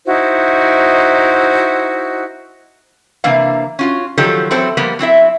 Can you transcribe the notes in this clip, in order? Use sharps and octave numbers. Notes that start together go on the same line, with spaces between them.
D#4 E4 F#4 C5
C3 E3 A#3 D4 F5
C#4 F4 F#4
D#3 F3 F#3 G4 A4
E3 F#3 C4 A4 C5
F3 G3 A#3 B3
F#3 C4 E4 E5